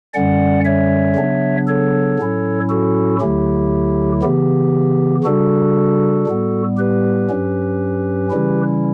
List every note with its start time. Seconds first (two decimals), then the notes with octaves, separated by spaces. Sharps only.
0.14 F#2 D3 G3 C#4 D5 F#5
0.65 C#5 E5
1.16 C#3 F#3 B3 D4
1.67 A4 C#5
2.19 A2 F#3 C#4 E4
2.69 F#4 A4
3.20 D2 D3 F#3 A3 E4 G4
4.23 C#3 E3 B3 G4
5.24 C#3 G3 D4 F#4 A4
6.27 A2 G3 B3
6.77 G4 B4
7.29 G2 F#3 C#4
8.31 C#3 E3 G3 C#4 E4